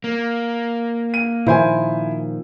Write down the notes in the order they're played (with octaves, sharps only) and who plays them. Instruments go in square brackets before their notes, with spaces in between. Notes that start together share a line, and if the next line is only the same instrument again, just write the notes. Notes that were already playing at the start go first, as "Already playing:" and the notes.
[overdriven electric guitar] A#3
[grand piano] D#7
[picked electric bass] A#2 D#3 F3 [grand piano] E4 C5 G#5